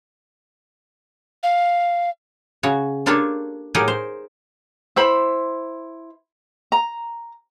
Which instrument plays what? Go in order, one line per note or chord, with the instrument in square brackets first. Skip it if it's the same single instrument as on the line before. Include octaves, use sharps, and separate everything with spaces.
[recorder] F5
[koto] C#3 F#4 C#5
A#3 D4 F4 G4 A4 C#5
A2 F#3 D#4 G4 G#4 A#4
C5
[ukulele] E4 C5 B5
A#5